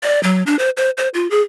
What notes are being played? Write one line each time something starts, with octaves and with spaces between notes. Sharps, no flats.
D5
F#3
D4
C5
C5
C5
F4
G#4